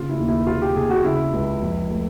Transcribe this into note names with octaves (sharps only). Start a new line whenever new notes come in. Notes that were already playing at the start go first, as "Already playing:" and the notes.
Already playing: C#3 F4
E4
D#2
E4
C3 F4
G4
C3 G#4
F#4
C#3 E4
C#2
F2
A3